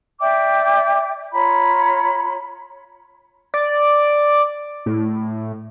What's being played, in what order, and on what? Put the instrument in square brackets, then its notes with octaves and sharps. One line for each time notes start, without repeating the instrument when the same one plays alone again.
[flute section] D5 E5 G5 D6
F4 C#5 A#5 B5
[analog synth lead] D5
A2